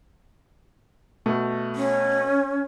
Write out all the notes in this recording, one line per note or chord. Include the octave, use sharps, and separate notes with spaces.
B2 A3
C#4